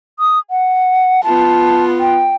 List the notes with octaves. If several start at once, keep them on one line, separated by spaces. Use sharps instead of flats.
D#6
F#5
B3 F4 A5
G5